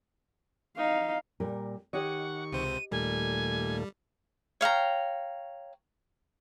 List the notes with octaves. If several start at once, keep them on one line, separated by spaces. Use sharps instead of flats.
D#4 F5
A#2 G3 A#4
D#3 G4 C#5 D#5 F#5 C#6
C#2 C3 C5 D#7
D#2 A#2 G3 A3 G#5
C#5 F5 G5 A#5